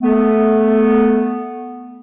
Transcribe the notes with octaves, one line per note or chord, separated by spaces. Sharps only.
A3 B3